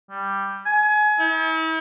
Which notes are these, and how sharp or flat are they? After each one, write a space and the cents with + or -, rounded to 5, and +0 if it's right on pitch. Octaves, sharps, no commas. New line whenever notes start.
G3 +5
G#5 +30
E4 -45